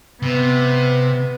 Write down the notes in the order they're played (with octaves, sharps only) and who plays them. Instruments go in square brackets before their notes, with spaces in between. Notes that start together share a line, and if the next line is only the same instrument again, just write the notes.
[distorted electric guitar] C3 [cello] B3